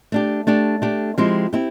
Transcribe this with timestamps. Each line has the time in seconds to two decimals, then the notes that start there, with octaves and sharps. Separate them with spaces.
0.12 A3 D4 G4
0.47 A3 D4 G4
0.82 A3 D4 G4
1.18 F3 G#3 C4 E4 G4
1.53 C4 E4 G4